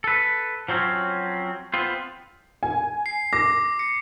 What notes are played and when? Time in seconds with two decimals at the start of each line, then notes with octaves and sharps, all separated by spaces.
0.04 A4 B4
0.69 F3 F#3 C4 C#4
1.74 B3 C4 F4
2.63 G#5
3.06 C7
3.33 D6 A#6
3.79 C#7